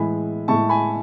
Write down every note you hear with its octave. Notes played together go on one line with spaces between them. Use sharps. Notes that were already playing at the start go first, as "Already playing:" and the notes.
Already playing: A2 E3 G#3 G#5 B5
A2 G#3 A5 C#6
G#5 B5